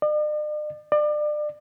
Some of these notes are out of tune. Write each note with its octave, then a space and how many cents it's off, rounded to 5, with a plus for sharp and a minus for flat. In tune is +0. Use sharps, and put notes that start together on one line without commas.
D5 +45
D5 +30